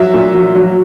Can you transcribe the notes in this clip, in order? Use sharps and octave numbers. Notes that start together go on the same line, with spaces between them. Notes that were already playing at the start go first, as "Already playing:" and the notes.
Already playing: F#3 E5
A#2
F#3
F#3